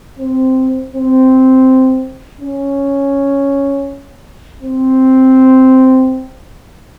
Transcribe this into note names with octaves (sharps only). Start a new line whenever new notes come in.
C4
C4
C#4
C4